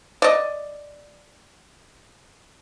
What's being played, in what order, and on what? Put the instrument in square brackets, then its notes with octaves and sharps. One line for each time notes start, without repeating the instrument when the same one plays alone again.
[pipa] D5 D#5